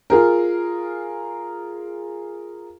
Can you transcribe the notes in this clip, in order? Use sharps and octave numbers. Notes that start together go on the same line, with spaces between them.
F4 G#4 A#4